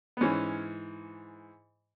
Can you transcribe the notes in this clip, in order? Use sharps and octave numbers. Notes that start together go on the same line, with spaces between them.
B3
G#2 E3 C#4